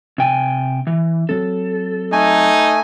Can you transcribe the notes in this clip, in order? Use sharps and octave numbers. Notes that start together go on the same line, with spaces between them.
C3 G5 G#5
E3
F#3 C4 A4
A3 D#4 G#5